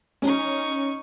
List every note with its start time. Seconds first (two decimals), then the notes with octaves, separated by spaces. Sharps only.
0.22 C#4 D#4 C#6